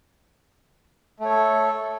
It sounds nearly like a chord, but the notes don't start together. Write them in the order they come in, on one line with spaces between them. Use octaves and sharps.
A3 C#5 A4